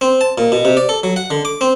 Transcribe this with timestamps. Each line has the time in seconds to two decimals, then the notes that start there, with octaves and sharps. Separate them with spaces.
0.01 C4
0.21 A5
0.38 A#2
0.52 B2
0.65 C3
0.77 D5
0.89 A4
1.03 F#3
1.16 F#5
1.31 D3
1.45 D6
1.61 C4